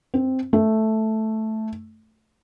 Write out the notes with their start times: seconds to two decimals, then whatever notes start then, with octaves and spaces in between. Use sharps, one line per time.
0.14 C4
0.53 A3